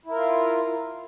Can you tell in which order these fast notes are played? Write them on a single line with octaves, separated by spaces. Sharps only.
E4 A#4 F4